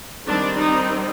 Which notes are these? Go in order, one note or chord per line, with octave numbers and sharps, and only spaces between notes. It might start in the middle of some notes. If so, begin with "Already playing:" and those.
D#3 G3 C4 D4
D#4